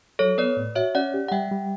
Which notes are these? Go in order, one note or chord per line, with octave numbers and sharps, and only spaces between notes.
F#3 A4 C#5
B3 B4 D5
A2
F#4 C#5 E5
C#4 D5 F#5
G4
F#5
G3 E5 G5
G3